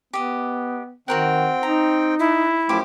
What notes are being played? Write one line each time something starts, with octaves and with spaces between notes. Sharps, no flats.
B3 G4 D#5
D#3 C4 F#4 A#4 F#5 G5
D#4 A#5
E4
F#2 F3 A3 G4 C5 D6